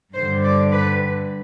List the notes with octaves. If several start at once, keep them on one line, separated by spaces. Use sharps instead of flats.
G2 D3 G3 C5
D5
B4